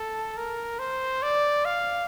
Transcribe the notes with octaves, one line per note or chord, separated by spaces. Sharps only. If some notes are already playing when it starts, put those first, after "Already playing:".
Already playing: A4
A#4
C5
D5
F5